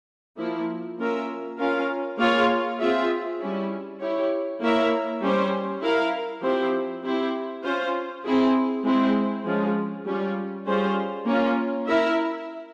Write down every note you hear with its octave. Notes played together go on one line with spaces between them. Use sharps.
F3 A#3 E4
A#3 C#4 F4 A#4 E5
C#4 F4 A#4 F5
A#3 F4 G#4 C#5 F5
C4 F4 G#4 E5
G3 C#4 E4
E4 G4 C#5
A#3 E4 A#4 C#5 E5
G3 C#4 G4 C5
E4 A#4 F5
F3 C4 E4 G4 C5
C4 E4 G4 C5
C#4 F4 C5
C4 E4 G#4
G#3 C4 E4 G#4 C5
F3 G#3 C#4 F4 G#4
G3 C#4 F4
G3 C#4 F4 G#4 C5
A#3 C#4 F4
E4 A#4 E5